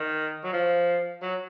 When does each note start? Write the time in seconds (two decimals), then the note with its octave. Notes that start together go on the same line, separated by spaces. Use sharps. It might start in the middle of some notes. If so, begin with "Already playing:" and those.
Already playing: D#3
0.44 F#3
0.53 F3
1.22 F#3